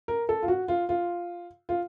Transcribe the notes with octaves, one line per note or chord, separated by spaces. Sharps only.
A#4
A4
F4
F#4
F4
F4
F4